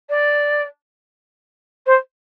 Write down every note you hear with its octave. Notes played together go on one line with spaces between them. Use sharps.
D5
C5